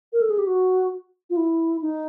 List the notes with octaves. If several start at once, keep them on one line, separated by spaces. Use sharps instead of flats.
A#4
A4
G#4
G4
F#4
F4
E4
D#4